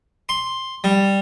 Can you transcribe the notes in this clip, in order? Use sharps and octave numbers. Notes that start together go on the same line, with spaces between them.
C6
G3